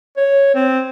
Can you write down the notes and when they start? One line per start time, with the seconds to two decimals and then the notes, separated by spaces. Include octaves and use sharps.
0.17 C#5
0.55 C4